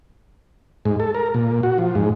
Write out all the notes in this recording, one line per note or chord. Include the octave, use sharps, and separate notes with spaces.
G#2
A4
A#4
A#2
F#4
F3
G#2